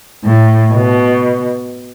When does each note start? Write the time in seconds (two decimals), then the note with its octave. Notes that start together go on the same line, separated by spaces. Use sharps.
0.24 A2
0.73 B2